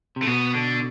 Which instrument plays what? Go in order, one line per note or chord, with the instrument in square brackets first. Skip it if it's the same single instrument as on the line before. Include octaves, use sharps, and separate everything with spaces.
[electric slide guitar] C3
[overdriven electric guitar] A3
[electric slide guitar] B2 [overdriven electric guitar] B3
[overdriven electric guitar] D3